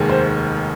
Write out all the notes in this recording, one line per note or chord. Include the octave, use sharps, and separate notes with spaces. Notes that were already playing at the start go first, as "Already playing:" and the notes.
Already playing: F1 D#2 D#3 G#3
C5